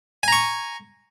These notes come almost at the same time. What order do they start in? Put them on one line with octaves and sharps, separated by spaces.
G#5 A#5 C#6